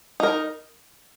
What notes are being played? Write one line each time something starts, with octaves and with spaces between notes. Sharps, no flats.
D#4 A#4